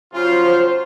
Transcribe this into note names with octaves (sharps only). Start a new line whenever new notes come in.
C#3 F#3 F4 C5